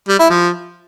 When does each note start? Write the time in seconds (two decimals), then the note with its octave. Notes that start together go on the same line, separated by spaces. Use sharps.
0.08 G3
0.19 E4
0.29 F3